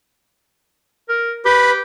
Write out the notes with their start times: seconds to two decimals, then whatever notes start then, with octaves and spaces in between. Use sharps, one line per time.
1.09 A#4
1.45 G4 B4 B5